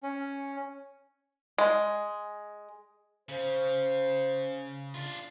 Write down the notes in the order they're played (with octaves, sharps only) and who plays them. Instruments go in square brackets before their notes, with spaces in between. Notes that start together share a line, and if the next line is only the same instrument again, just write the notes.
[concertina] C#4
[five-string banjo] G#3
[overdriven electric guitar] C#3 [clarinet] C5
[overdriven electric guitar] D4 F4